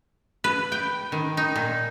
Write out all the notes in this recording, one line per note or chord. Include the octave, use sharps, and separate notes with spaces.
B4
G5
D#3
D#4
A#2